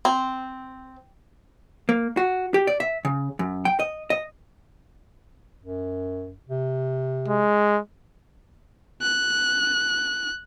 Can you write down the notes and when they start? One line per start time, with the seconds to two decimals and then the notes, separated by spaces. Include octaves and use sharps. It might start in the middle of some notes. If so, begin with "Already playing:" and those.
0.05 C4
1.89 A#3
2.17 F#4
2.54 G4
2.67 D5
2.80 E5
3.05 C#3
3.39 F#2
3.65 G5
3.79 D#5
4.10 D#5
5.63 F#2
6.49 C3
7.28 G#3
9.01 F#6